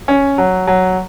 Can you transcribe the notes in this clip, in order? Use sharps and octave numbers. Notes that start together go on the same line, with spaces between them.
C#4
F#3
F#3